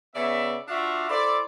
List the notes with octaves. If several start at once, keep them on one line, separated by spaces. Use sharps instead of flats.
C#3 B3 D5 E5
D4 F4 F#4 D5 E5 F5
E4 A4 C5 D5